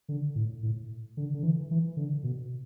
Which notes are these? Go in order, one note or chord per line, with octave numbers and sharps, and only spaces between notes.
D3
A2
A2
D3
D3
E3
E3
D3
B2